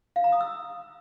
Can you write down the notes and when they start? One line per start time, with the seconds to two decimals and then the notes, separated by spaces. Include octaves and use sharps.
0.16 F5
0.24 A#5
0.32 D#6
0.41 E6